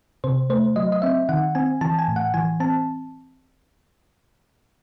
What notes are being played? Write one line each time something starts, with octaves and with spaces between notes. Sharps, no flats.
C3 C5
A3 C5
F#3 D#5
D#5
C4 E5
D#3 F#5
C4 G#5
E3 A5
G#5
A2
F#5
E3 G#5
C4 A5